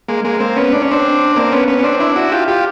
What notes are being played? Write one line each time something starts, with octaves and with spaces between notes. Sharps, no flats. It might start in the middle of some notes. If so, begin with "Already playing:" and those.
G#3 A#3
G#3 A#3
A#3 C4
B3 C#4
D4
C#4
C4 D4
A#3 C4
B3 C#4
B3 C#4
C#4
C4 D4
D4 E4
E4 F#4
F4 G4
F4 G4